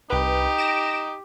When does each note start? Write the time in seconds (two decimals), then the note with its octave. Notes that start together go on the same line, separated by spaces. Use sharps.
0.10 C2 D#4 G4 B4
0.58 A#6 D7 E7